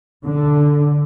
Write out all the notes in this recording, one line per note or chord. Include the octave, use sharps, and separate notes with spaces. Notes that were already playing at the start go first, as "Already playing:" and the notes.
D3